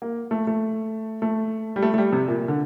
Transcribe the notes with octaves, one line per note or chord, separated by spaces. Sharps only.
A#3
A3
A3
A3
G3
A3
A3
G3
C3
A#2
D3